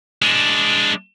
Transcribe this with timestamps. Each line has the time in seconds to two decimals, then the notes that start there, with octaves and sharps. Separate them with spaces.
0.22 G#3 D4